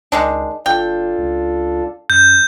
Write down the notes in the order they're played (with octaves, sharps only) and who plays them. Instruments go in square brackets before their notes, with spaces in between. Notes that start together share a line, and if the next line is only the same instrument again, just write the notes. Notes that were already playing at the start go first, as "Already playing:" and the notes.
[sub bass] C#2 [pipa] D#3 G#3 D4
[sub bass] G1 [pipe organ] D4 F4 A4 [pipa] G5
[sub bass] C#2
[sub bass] F#2 [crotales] G6